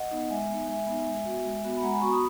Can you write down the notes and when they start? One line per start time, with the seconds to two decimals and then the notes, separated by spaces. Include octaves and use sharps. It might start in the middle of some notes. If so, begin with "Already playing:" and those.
Already playing: D#5 F#5
0.11 B3 D#4
0.30 G#3 E5 G#5
0.49 B3 D#4
0.68 G#3 E5 G#5
0.87 B3 D#4
1.07 G#3
1.25 B3 F#4
1.45 G#3
1.64 B3 F#4
1.77 B5
1.82 G#3 F#5 A#5
1.93 G#5 B5
2.01 B3 F#4 A#5 C#6
2.11 B5 D#6